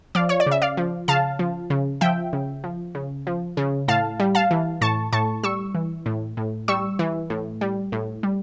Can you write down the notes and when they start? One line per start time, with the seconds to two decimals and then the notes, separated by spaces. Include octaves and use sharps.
0.15 F3 D5 F5
0.29 C#5
0.40 D5
0.47 C#3 E5
0.62 D5 F5
0.77 F3
1.08 C#3 F5 A5
1.39 F3
1.70 C#3
2.01 F3 E5 G5
2.33 C#3
2.64 F3
2.95 C#3
3.27 F3
3.57 C#3
3.88 A2 F5 A5
4.20 G3
4.35 F5 A5
4.51 E3
4.81 A2 A5 C#6
5.13 A2 A5 C#6
5.43 G3 C#6 E6
5.75 E3
6.06 A2
6.37 A2
6.68 G3 C#6 E6
6.99 E3
7.30 A2
7.61 G3
7.92 A2
8.23 G3